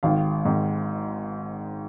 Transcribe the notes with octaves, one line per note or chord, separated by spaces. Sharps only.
G#1 G#2 D#3 F5
G#1 G#2 D#3